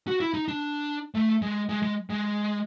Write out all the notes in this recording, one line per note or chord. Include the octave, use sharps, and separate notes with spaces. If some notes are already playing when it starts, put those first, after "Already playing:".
F#4
E4
D#4
D4
A3
G#3
G#3
G#3
G#3